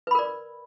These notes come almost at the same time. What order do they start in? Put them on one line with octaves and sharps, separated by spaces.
B4 B5 A#4 D5